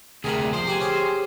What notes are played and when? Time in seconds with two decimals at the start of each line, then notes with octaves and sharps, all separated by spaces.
0.24 D2 C3 G#4 A#4 F#5
0.53 F3 C5 C6
0.67 G4 F#5 G#5
0.80 C#4 G4 G#4